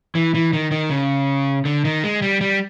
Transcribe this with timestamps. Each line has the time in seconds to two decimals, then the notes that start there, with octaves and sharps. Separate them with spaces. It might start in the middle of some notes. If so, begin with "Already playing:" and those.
0.15 E3
0.35 E3
0.53 D#3
0.71 D#3
0.91 C#3
1.65 D3
1.85 D#3
2.04 G#3
2.22 G3
2.41 G3